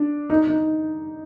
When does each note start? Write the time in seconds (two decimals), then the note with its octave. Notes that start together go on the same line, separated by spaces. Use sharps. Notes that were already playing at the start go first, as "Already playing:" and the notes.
Already playing: D4
0.30 D#4
0.47 D#4